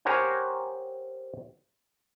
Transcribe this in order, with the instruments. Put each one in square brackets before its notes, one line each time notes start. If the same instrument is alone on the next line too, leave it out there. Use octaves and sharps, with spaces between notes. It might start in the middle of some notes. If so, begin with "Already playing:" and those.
[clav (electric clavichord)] G4 A#4 C5 C#5 F#5 G#5